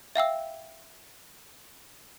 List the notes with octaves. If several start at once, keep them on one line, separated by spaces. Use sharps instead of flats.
E5 F5 G5 E6